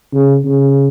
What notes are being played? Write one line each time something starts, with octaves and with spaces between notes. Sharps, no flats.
C#3
C#3